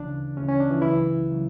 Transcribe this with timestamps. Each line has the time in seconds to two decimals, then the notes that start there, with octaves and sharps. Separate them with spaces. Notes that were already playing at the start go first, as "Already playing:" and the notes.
Already playing: D2 C#3 E3 D4
0.37 D2 C#3 E3 C#4
0.48 C#4
0.60 D4
0.70 E3 E4
0.82 C#2 C#3 E3 F#3 E4
1.29 C#3 F#3